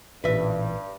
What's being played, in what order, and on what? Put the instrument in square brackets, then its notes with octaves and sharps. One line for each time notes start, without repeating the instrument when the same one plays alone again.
[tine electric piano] A1 A#2 [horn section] G2 [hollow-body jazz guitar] B4 E5